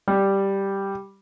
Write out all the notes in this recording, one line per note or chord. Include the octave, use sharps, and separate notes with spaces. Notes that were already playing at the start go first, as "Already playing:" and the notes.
G3